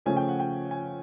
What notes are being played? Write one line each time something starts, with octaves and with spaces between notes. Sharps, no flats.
C#3 F3 A3 C#4 G#5
G5
F#5
G5
G#5